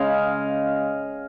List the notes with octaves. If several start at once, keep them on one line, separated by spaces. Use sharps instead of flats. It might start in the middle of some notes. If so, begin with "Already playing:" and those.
Already playing: C#3 G#3 D#5 F5 G#5